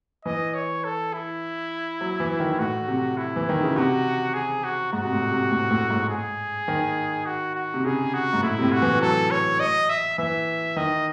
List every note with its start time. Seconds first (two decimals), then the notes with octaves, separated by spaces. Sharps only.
0.25 E3 D#5
0.54 C#5
0.84 A4
1.13 E4
2.01 F#3
2.20 E3
2.40 D#3
2.59 A2 F#4
2.88 C3
3.17 E4
3.36 E3
3.49 D#3
3.63 C#3
3.76 C3 F#4
4.34 G#4
4.64 F#4
4.93 G#2 F#4
5.05 C3
5.12 A2
5.32 C3
5.51 A2
5.71 A2
5.90 G#2
6.09 G#4
6.68 D#3
7.26 F#4
7.55 F#4
7.74 C3
7.85 C#3 G#4
8.14 F#4
8.33 G#2
8.43 A2 E4
8.58 C3
8.62 A2
8.72 F#4
8.82 E3
9.01 F#3 A4
9.31 C#5
9.60 D#5
9.89 E5
10.18 E3 E5
10.76 D#3 D#5